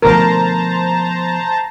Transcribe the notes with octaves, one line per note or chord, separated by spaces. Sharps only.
B2 D3 F3 A3 A#4 C5 A5 A#5